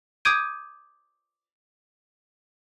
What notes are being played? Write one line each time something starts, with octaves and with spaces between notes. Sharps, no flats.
D6 D#6 G6 G#6 D7 D#7